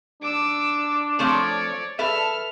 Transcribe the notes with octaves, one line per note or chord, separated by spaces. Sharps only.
D4 D6 E6
F3 A3 C4 C#5 D5
A4 B4 E5 F6